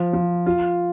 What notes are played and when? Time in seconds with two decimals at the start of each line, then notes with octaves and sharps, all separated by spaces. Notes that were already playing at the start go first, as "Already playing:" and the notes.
Already playing: F3
0.13 F3
0.46 F4